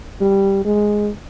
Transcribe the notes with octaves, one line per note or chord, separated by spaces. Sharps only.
G3
G#3